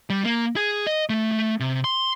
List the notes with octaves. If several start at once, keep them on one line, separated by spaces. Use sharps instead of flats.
G3
A#3
G#4
D#5
A3
A3
C3
C6